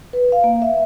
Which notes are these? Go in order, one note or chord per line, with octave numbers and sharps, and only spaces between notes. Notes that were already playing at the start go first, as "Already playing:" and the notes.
B4
F5
A#3
E5